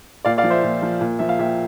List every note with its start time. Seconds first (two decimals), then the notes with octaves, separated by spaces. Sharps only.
0.25 A#2 D5 F5
0.38 D5 F5
0.44 F3
0.50 C5 E5
0.63 A#2
0.82 F3
1.01 A#2
1.19 F3 E5
1.29 F5
1.39 A#2 E5 G5